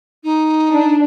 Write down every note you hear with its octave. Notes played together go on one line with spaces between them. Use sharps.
D#4
D4